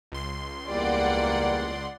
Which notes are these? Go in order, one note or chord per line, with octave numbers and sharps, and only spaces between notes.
C#2 C6
E2 G3 A#3 D5 F#5